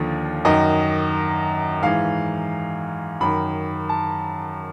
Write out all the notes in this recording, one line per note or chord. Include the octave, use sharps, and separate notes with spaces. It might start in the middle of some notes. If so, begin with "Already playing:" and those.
Already playing: D#2 D3 F3
F#2 D#3 D#5
G#2 E3 F5
F#2 D#3 B5
A5